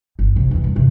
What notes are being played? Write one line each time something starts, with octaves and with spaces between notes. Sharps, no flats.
G1
C3
E2 C4
G2
F#2 C3